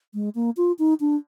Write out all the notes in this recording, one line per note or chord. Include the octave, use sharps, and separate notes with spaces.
G#3
A#3
F4
D#4
D4